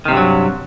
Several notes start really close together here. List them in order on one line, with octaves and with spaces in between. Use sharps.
D#3 C3 G2 E3 F#3